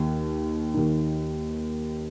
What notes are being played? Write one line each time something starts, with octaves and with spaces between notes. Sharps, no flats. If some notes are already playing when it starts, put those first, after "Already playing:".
Already playing: D#2 D#3
D#2 D#3